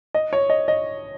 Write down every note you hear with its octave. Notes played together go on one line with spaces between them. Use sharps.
D#5
C#5
D#5
D#5